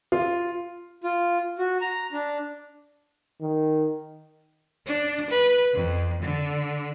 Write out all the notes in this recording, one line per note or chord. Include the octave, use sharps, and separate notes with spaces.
F4
F4
F#4
A#5
D4
D#3
D4
B4
F2
D3